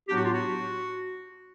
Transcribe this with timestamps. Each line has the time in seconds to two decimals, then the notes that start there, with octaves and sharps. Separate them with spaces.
0.09 A2 F#3 B3 D4 G4
0.16 F#4
0.25 F4
0.33 F#4